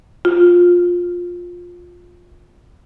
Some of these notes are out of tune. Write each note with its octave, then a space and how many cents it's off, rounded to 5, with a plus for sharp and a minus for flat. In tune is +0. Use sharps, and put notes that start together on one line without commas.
F4 +15